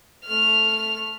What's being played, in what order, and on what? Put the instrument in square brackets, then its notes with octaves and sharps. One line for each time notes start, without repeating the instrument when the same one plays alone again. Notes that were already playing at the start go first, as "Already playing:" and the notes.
[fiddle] A3 F6